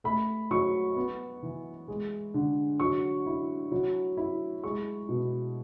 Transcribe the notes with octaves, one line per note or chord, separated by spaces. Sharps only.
A3 B5
F#3 C#6
B3
E3
G#3
D3
F#3 C#6
E4
F#3
E4
G#3 C#6
B2